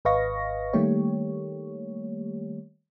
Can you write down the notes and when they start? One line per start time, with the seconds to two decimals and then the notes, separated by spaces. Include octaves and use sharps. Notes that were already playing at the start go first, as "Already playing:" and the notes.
0.05 G#1 B4 D#5 F5 C#6 A#6
0.73 D#3 G3 A3 A#3 G4 C#5